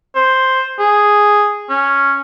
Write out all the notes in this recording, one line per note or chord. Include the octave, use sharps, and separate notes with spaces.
C5
G#4
C#4